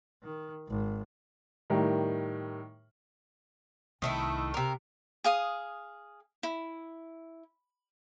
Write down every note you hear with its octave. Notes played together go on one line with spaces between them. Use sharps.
D#3
G#1
A2 D#3 G3 A#4
C2 D#3 A3 E4
C3 A#4
G#4 F5 D#6
E4